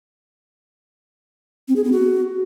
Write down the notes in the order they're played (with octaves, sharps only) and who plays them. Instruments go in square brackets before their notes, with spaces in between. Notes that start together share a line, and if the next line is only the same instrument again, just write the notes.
[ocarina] C4
G#4
B3
F#4